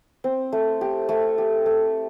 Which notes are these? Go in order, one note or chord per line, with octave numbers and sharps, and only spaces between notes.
C4
A3
G4
A3
G4
A3